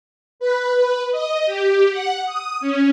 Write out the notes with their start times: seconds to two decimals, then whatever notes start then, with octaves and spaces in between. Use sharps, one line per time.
0.40 B4
0.75 B4
1.12 D#5
1.46 G4
1.90 F#5
2.26 D#6
2.61 C#4